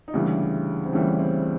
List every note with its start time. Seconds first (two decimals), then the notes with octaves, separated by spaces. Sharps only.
0.08 D#4
0.13 D2 C#3 E3 G3 D4
0.85 C4
0.93 D2 C#3 E3 G3 C#4
1.19 C4